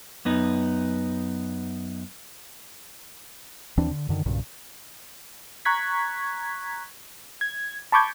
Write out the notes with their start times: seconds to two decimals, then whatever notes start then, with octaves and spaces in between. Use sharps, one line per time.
0.25 F#2 B3 D#4
3.77 D#2 E3 C4 D4
3.91 D3
4.09 F#2 D3 D#3
4.26 B1 G2 A#2 C#3
5.65 A#5 C#6 F#6 G#6 B6
7.41 G#6
7.92 A5 B5 C#6 D6 G6 G#6